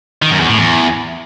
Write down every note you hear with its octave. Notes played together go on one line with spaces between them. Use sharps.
D#3
F#2
E2
A2
E2